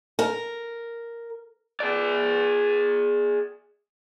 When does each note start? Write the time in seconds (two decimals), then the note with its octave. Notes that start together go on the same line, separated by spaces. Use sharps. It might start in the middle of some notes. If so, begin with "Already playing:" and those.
0.19 A#4
1.80 G#4 D5